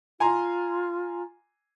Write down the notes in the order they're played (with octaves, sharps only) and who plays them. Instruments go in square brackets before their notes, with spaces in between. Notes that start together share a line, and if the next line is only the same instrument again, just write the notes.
[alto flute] F4 [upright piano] G#5 A#5 C6